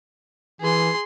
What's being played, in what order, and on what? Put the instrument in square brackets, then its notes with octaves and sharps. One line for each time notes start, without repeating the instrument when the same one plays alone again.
[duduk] E3 [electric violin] G#4 C6